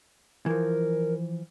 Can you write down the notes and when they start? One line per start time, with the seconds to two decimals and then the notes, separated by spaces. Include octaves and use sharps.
0.46 E3 F3 A#4